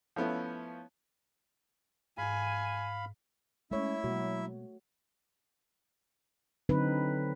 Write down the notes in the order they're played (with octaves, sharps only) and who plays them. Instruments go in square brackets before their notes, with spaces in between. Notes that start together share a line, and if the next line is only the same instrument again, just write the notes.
[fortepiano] F3 A3 B3 C#4 E4
[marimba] G#2 [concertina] F5 B5 [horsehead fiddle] G#5
[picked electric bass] G#3 [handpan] A3 C#5 [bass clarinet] C#4 [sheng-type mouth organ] E4 E5
[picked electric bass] B2 G#3 A#3 [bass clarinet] F#3 [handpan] F#4
[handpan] D3 F#3 C4 D#4 B4